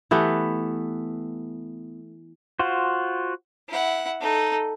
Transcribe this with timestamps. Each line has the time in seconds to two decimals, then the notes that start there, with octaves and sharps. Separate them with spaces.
0.11 E3 A3 B3 G4
2.59 F4 F#4 C5
3.68 E4 F#5
4.21 D#4 A4